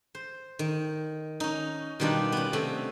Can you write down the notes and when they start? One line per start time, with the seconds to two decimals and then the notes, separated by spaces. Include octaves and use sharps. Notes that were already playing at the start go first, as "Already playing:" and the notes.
0.15 C5
0.59 D#3
1.40 C#4 D#4
2.00 B2 D#3 G3 D4 D#4 F4
2.32 B3 C#4
2.53 C3 A3 C#4 B5